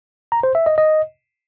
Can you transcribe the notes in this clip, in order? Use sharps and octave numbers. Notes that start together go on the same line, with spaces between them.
A#5
C5
E5
D#5
D#5